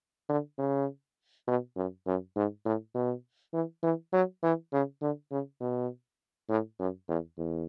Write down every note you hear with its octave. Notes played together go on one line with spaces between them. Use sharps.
D3
C#3
B2
F#2
F#2
G#2
A2
B2
E3
E3
F#3
E3
C#3
D3
C#3
B2
A2
F#2
E2
E2